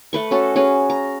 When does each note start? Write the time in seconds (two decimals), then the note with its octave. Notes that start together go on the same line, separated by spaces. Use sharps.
0.13 A3 B4 C#6
0.31 C#4 F#4 A4
0.56 C#4 F#4 G#4 B4
0.90 A#5